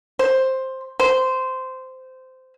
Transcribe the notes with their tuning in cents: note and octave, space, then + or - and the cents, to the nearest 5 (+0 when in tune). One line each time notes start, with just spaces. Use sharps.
C5 +10
C5 -15